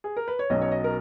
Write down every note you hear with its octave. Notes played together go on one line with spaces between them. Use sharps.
G#4
A#4
B4
C#5
B1 B2 F#3 C#4 D#5
C#5
D#5
A#4